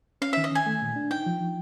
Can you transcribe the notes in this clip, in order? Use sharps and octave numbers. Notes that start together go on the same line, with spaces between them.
C#4 F5
D#3 E5
D#5
D#3 G#5
A3
A#2
D4
D#4 G5
F3
F3